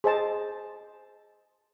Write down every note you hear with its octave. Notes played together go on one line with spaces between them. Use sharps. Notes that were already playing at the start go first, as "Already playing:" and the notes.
G#4 C5 D#5 A5